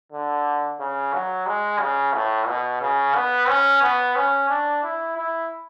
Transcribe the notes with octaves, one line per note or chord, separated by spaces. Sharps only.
D3
C#3
F#3
G#3
C#3
A2
B2
C#3
B3
C#4
B3
C#4
D4
E4
E4